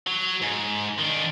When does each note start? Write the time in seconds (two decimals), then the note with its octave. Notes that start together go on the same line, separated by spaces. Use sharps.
0.07 F#3
0.42 G#2
0.99 D#3 D4